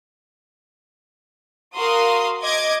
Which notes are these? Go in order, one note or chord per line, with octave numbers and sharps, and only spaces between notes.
F#4 A#4 F5 C6 D#6
D#5 D6 G#6 D7